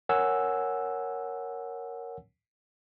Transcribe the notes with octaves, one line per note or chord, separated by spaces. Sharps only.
A#4 C#5 F#5 G#5 E6